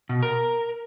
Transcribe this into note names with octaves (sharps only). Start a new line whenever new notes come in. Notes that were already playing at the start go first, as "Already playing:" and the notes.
B2
A#4